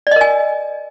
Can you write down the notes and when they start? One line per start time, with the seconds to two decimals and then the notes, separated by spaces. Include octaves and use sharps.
0.07 D5
0.11 D#5
0.16 A#4
0.21 G#5